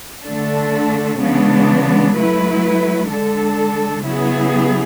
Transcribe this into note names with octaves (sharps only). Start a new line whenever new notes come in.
D3 A3 D4 A4
C#3 E3 G#3 B3 D4
F#3 A3 E4 B4
D3 G#3 D4 A4
C#3 F#3 B3 E4 G#4